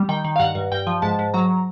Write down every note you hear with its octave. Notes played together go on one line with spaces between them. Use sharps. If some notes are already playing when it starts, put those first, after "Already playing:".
Already playing: G3
D#3 G5
D#3
F5
G2 F#5
G2
G2 G5
F3
G#2 A5
G#2
F#3 A#5